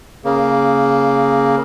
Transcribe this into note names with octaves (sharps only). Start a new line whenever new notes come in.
C#3 A#3